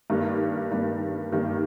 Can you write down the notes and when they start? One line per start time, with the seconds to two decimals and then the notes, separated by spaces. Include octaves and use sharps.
0.10 G2 D#3 G3 A#3
0.71 G2 D#3 G3 A#3
1.32 G2 D#3 G3 A#3